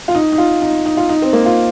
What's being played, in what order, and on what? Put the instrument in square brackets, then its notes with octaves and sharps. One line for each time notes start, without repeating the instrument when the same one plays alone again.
[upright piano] F4
D#4
D#4
F4
D#4
D#4
F4
D#4
C4
A#3
F4